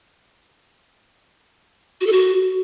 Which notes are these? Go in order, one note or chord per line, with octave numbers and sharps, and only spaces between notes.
F#4
A4
F#4